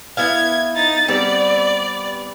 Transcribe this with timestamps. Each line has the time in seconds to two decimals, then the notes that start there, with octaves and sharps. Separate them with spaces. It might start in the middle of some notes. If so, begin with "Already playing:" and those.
0.17 B3 E4 F5 G#6
0.75 D#4 A6
1.08 G3 B3 C4 D5